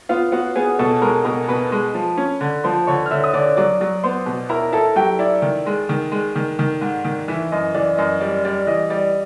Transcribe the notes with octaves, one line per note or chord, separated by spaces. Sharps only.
B3 F4 F5
B3 F#4 F#5
B3 G#4 G#5
B2 A4 A5
G#3 A#4 A#5
B2 A#4 A#5
B2 B4 B5
G#3
F3
C#4
D3
F3 C5 C6
D3 C#5 C#6
F6
D3 E5 E6
D#6
D3 D5 D6
F#3 D5 D6
F#3
B3 C5 C6
B2
E4 A#4 A#5
E4 A4 A5
F#3 G4 G5
E4 D5
D#3
G#3
D#3
G#3
D#3
D#3
G#2
D#3
E3 E4 E5
F#2 D#5
E3 D5
F#2 D#5
G3 D5
G3 D5
E3 D#5
G3 D5